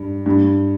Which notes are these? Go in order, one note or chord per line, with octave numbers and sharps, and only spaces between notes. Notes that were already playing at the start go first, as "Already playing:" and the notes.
Already playing: G2
G2